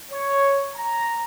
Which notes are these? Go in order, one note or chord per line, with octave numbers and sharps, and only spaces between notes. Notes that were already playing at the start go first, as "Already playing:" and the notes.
C#5
A#5